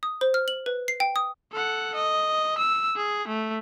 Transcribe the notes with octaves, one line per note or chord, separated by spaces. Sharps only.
D#6
C5
F6
F#7
B4
C7
G5
D#6
A4 F#5
D#5
E6
G#4
A3